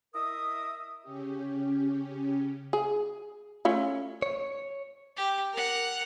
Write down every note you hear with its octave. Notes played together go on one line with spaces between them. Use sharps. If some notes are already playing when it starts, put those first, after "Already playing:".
E4 A#4 D#5 E5 D#6
C#3 C#4 G4
G#4
A3 C#4 F4
C#5
G4
A#4 F#5